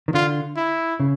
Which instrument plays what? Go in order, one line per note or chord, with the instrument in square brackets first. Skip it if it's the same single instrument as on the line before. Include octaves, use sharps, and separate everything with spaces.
[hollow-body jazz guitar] D#3
[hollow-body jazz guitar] D3 [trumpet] F4
[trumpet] E4
[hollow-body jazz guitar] C#3